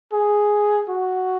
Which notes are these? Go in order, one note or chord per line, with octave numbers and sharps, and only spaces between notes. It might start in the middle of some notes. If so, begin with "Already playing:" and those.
G#4
F#4